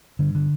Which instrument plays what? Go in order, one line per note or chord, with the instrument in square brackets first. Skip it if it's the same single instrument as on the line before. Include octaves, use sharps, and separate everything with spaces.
[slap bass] G2 D3
D3